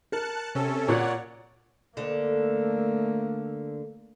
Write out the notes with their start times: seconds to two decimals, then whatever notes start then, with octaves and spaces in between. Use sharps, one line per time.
0.12 A#4 A5 F#6 C#7
0.55 C3 C#4 A4
0.88 A#2 C#5 D5 F#5
1.97 D2 D3 A3 A#3